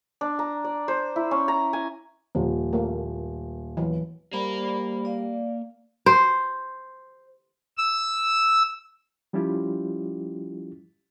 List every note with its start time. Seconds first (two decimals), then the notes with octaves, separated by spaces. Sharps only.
0.21 D4
0.39 A#5
0.64 D5
0.88 C5
1.16 E4
1.31 C#4
1.48 A#5
1.73 G#5
2.35 D#1 F3
2.73 A3 A#3
3.77 E3 F#3
4.33 G3 A#3 A#4 C5 D5 B5
5.05 D5 F5
6.06 C5
7.78 E6
9.33 F3 G3 C#4 E4 F4 G4